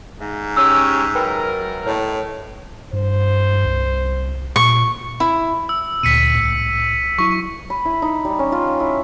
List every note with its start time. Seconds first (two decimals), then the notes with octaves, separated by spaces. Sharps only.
0.21 G#2 E5
0.57 C#4 G4 E6
1.15 F#2 A#4 B4 G5 B5
1.86 A2 C#5 D#5
2.93 G2 C5
3.66 C2
4.56 A#2 C#6
5.20 E4
5.69 E6
6.03 D2 A#2 B6 C#7 D#7
6.35 C2 A2
7.18 F#3 E4 C#6
7.70 B5
7.85 E4
8.02 D#4
8.25 G3
8.39 C#4
8.52 F4
8.80 E4